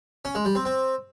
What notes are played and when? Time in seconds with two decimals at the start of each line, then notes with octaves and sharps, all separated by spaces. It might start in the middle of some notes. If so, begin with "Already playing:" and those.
0.25 C#4
0.35 G#3
0.45 G3
0.55 C4
0.65 C4